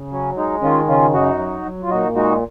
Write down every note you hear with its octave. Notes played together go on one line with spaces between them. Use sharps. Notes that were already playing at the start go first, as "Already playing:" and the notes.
Already playing: C#3
F#3 C#4
G#3 D#4
D#3 C#4 F4
C#3 C#4 F4
F#2 D#4 F#4
F#3
F#3
F4
A#2 D#4 F#4
G#3 D#4 F#4